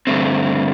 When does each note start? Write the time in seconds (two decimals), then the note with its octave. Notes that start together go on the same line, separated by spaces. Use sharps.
0.07 G2 D3 A3 C4